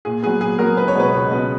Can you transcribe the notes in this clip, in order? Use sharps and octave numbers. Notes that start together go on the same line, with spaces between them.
A#2 G#4
F#3 B3 G#4
A#2 G#4
F#3 B3 A#4
C#2 B4
C#5
B2 G#3 B3 B4
C#2
B2 G#3 B3